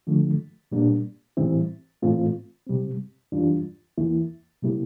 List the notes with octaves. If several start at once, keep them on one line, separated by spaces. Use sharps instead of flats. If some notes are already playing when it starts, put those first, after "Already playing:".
D3 F3 A3
A#2 G3 A#3 D4
A2 E3 G3 C4 E4
A2 E3 A3 C4 F4
C3 G3 C4
F2 E3 G3 D4 F4
E2 E3 A#3 E4
C3 G3 A#3 E4